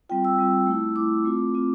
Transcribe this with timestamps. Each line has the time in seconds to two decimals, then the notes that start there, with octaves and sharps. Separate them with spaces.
0.09 G3 C4 F4 G5
0.25 E6
0.38 G3 C4 F4
0.67 A3 E4
0.96 A3 E4 D6
1.25 A3 C4 F4
1.54 A3 C4 F4